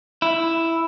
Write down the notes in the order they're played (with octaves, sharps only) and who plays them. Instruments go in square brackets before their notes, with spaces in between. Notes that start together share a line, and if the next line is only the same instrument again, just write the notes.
[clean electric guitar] E4